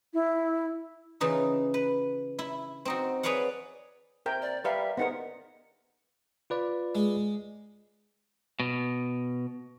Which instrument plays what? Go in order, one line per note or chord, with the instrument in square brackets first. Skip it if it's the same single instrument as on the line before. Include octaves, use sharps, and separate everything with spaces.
[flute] E4
[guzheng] C#3 E3 D#4 F4
B4
E4
C4 D#4 F#4
G#4 B4 C#5 D5 F5 F#5
[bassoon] C3 [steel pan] A#4 G5
[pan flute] D5
[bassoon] G3 [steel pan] A#4 B4 F5 [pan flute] E5
[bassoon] G#2 [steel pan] B3 D#4 A#4 [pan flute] F#5
[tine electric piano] F4 B4 D5
[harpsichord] G#3
[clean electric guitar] B2